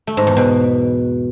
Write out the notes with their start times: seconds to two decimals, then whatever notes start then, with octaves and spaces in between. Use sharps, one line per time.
0.07 A3
0.17 G#2
0.27 E2
0.37 B2